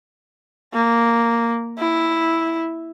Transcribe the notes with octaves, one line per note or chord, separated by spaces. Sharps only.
A#3
E4